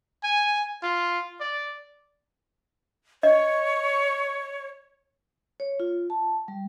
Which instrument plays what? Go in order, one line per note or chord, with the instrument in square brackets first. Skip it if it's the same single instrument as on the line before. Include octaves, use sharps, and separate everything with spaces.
[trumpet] G#5
F4
D5
[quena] C#5 [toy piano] D#5
[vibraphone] C#5
F4
A5
G3